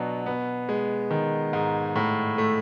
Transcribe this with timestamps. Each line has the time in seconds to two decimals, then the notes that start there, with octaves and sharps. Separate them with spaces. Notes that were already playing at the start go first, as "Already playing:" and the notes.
Already playing: B2 F#3 B3 D4
0.26 B3
0.69 G#3
1.11 D#3
1.53 G#2
1.96 A2
2.38 A3